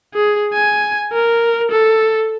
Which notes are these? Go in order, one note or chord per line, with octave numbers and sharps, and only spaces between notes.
G#4
G#5
A#4
A4